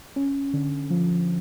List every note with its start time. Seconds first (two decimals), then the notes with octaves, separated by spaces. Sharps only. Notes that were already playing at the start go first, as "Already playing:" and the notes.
0.16 C#4
0.53 D3
0.90 F3